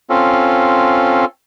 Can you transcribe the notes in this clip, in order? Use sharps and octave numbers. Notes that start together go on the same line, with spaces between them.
C4 C#4 F4 A4